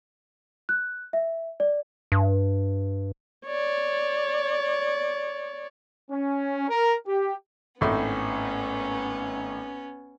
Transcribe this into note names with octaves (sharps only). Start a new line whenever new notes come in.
F#6
E5
D5
G2
C#5 D5
C#4
A#4
G4
G#1 A2 A3 B3 C#4